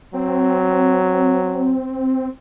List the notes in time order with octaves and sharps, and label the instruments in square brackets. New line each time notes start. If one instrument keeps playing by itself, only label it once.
[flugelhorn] F#3 [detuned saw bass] C4